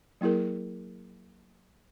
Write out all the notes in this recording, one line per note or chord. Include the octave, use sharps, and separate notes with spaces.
F#3 A#3 E4 G#4 A#4